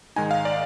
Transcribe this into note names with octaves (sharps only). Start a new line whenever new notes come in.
G#2 D#3 G#3 D#4 G#5
F5
D5